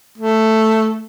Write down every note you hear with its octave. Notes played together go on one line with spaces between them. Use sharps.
A3